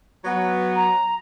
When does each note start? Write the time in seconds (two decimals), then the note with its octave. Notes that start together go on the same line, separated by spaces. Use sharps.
0.25 F#3 B3
0.75 A#5